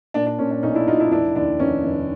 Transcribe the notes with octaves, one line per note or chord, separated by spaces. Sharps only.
A#2 D4
D4
A#2 C#4
D4
B1 C#4 D#4
D4 E4
B1 D#4 F4
D4 E4
F1 D4 E4
D#2 D4
F1 C#4
F1